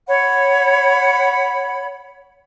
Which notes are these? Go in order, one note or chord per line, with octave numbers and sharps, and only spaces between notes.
C#5 F#5 B5